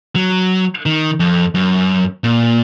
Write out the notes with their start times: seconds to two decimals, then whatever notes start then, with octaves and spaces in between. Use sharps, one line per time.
0.16 F#3
0.86 D#3
1.20 F2
1.55 F#2
2.24 A#2